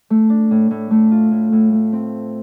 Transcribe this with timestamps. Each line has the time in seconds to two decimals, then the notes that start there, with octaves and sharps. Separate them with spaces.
0.10 A3
0.30 D4
0.51 A2
0.71 A2
0.91 A3
1.11 F4
1.31 A2
1.52 A2
1.73 A3
1.92 C4